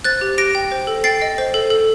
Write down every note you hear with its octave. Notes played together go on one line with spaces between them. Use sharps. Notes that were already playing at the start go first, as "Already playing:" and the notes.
C5 F#6 A6
G4
G4 A#6 D7
G5
C5
A4
G5 A6 C7
D#5
C5
A4
A4